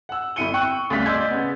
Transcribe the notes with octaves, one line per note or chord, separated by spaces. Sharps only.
F#5 E6
G1 F2 E4 C#7 D#7 G7
G5 C#6 E6 F#6
D2 G2 C#3 F5 A6 B6
D5 D#5 C6 E6 G6 G#6
C#3 B3